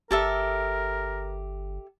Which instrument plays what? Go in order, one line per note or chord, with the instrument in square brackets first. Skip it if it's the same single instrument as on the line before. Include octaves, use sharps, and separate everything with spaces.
[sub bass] G1 [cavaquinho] G4 A4 E5 [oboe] A#4